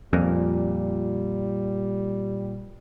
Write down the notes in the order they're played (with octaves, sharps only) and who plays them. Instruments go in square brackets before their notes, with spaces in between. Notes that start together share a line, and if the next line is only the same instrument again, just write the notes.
[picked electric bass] F2 [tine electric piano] A#2 [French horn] G3